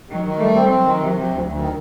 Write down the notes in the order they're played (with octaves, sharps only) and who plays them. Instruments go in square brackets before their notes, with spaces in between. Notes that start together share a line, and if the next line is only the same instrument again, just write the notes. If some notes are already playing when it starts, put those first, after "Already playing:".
[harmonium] D#3 [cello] F#3
[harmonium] D#3
[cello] G3 [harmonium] A3
[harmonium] C4
[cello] F#3 [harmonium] C4
[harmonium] D#3
C3
C3
D2
D2
D#3